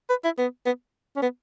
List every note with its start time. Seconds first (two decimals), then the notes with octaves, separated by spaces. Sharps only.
0.09 B4
0.24 E4
0.38 B3
0.66 B3
1.16 C#4
1.22 B3